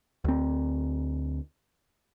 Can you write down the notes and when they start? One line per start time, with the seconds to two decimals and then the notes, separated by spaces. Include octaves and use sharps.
0.24 D2 C4